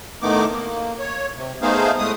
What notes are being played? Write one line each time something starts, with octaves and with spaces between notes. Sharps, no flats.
A2 D#3 A3 B3 D#4 D6
A#3
C#5
C3
A3 B3 D#4 G#4 C5 F5
A2 G#3 A3 D#6